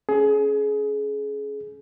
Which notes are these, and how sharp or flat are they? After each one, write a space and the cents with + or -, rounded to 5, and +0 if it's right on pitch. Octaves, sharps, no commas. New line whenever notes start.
C#4 +0 G#4 +25